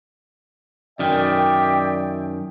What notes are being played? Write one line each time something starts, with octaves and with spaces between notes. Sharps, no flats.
F#2 D#3 D5 E5 G5